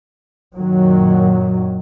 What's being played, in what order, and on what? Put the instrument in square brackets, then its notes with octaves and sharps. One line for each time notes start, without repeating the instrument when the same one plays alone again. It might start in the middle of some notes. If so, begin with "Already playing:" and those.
[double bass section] F#2 A#2 D#3 F#3